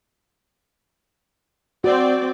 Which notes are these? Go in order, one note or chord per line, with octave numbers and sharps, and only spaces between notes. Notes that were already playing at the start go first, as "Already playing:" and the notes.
C4 F#4 D5